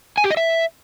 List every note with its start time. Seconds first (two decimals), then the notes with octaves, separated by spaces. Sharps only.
0.18 G#5
0.24 G4
0.31 D#5
0.37 E5